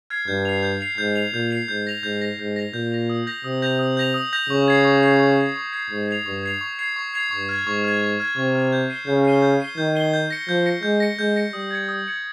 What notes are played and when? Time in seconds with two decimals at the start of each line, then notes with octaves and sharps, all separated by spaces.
0.10 F6 G#6 C7
0.28 G2 G6
0.45 C7 F7
0.63 G6
0.81 C7 F7
0.98 G#2 G6
1.15 C7 F7
1.33 A#2 G6
1.51 C7 F7
1.68 G#2 G6
1.87 A#6 F7
2.03 G#2 G6
2.21 A#6 F7
2.39 G#2 G6
2.56 A#6 F7
2.73 A#2 G6
2.92 A#6 F7
3.10 D#6
3.27 G6 A#6 F7
3.44 C3 D#6
3.62 G6 A#6 F7
3.79 D#6
3.97 G6 A#6 F7
4.14 D#6
4.33 G6 A#6 F7
4.50 C#3 C#6
4.68 G#6 C7
4.85 C#6
5.03 G#6 C7
5.20 C#6
5.38 G#6 C7
5.56 C#6
5.72 G#6 C7
5.91 G#2 C#6
6.08 G#6 C7 F7
6.26 G2 C#6
6.43 G#6 C7 F7
6.61 C#6
6.79 G#6 C7 F7
6.96 C#6
7.14 G#6 C7 F7
7.31 G2 C#6
7.49 F6 G#6
7.67 G#2 C#6
7.84 F6 G#6
8.01 C#6
8.20 F6 G#6
8.36 C3 C#6
8.55 F6 G#6
8.73 G6
8.90 C7 D#7 G7
9.07 C#3 G6
9.24 C7 D#7 G7
9.42 G6
9.60 C7 D#7 G7
9.77 D#3 G6
9.95 C7 D#7 G7
10.13 G6
10.30 A#6 C#7
10.48 F3 G6
10.66 A#6 C#7
10.83 G#3 G6
11.00 A#6 C#7
11.19 G#3 G6
11.36 A#6 C#7
11.53 G3 D#6
11.71 G#6 C#7
11.89 D#6
12.07 G#6 C#7